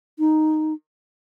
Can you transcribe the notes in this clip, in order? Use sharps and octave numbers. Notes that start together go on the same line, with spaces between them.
D#4